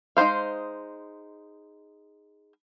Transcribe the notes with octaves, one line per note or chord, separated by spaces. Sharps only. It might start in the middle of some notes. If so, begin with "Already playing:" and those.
G#3 D#4 F#4 C5 F5